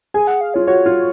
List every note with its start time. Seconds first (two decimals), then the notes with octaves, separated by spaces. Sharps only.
0.14 G#4 G#5
0.27 F#5
0.41 F5
0.54 F4 C#5
0.67 F#4 C#5
0.86 F4